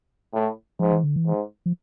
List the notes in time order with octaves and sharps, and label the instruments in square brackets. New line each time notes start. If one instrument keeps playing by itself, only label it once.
[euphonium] A2
[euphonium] G#2 [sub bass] F3
[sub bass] E3
D3
E3
[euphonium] G#2
[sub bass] F3